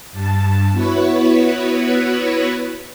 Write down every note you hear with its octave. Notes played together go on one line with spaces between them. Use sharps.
G2 A5
B3 E4 F#4 B4 C#5